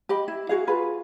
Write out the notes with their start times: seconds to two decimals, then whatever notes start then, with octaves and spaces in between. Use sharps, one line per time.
0.09 G4 D#5 B5
0.28 E4
0.49 F#4 G#4 F5
0.67 F4 G#4 B4